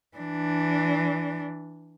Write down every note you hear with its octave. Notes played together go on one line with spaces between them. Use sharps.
E3 D4